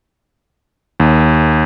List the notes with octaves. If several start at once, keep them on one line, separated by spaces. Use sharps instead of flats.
D#2